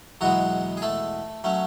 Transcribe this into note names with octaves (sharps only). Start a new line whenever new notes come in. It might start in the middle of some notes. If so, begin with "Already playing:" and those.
E2 B2 F#3 G#3 B3 F#4
G#4
A3 A4
F#3 A3 C#4